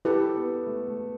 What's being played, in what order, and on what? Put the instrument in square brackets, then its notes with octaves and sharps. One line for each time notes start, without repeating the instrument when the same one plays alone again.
[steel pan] E4 G4 B4 [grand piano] A4
[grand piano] B3
A3
A3